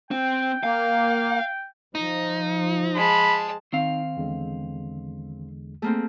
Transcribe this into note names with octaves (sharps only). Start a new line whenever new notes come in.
C4 G5
A#3 F5
F3 D#4
G#3 A5 B5
D#3 C4 D#4 F5
E2 D3 G#3
A3 A#3 C4 G#4